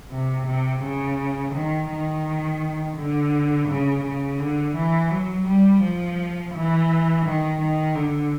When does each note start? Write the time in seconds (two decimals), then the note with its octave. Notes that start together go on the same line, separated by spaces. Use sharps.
0.11 C3
0.47 C3
0.83 C#3
1.54 D#3
1.89 D#3
2.97 D3
3.68 C#3
4.03 C#3
4.39 D3
4.75 E3
5.10 F#3
5.46 G3
5.82 F3
6.54 E3
7.25 D#3
7.60 D#3
7.95 D3